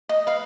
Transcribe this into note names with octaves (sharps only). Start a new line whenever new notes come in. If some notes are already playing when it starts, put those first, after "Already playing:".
D#5
B4 F5